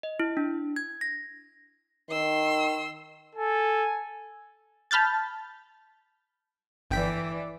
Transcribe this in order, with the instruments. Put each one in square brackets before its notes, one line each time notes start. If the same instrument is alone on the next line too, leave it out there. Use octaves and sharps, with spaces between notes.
[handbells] D#5
E4
D4
G#6
A#6
[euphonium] D#3 [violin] C6 E6
[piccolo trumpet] A4 [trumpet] G#5
[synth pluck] A5 B5 F6 G6 A6
[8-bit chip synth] G1 G5 B6 [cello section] E3 D5